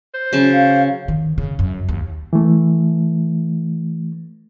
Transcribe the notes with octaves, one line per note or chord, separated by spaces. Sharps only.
C5
C#3 F#3 C#4 A5
F5
D#3
C#3
F#2
D#2
E3 A3